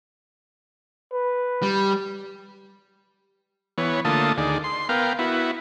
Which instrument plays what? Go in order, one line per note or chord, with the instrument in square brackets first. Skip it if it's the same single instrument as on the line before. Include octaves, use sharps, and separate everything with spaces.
[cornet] B4
[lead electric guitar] G3
[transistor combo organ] E3 B3 C#5
D3 A3 A#3 F4 A5 D#6
D2 D#3 G#4 D5
C6
B3 A#4 F5 G5
B3 E4 F#4